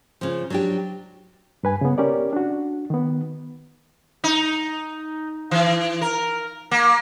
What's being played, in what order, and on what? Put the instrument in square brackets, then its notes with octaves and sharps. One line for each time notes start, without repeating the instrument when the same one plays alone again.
[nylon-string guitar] C#3 F3
F#3 D4 G4
[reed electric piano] G2 B4 G#5
C#3 B3
C#4 G4 A#4 D5
D4 F#4
D#3 B3
[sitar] D#4
E3
A#4
A#3